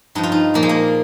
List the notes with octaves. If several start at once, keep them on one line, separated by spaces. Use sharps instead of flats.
G2 F3 D#4
F4
D#4
A#2 F3 A#3
G#3
A#3